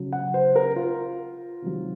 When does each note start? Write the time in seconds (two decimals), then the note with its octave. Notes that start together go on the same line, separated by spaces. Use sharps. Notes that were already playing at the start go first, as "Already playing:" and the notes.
Already playing: C#3 F#3
0.13 F#5
0.34 C5
0.56 A#4
0.76 F4
1.62 C3 D#3 F#3